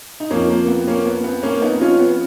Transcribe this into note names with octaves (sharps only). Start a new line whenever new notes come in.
D#4
F2 F3 A#3 C#4
A#3
B3
A#3 C#4
B3
B3
A#3 C#4
B3 D#4
C#4 F4
B3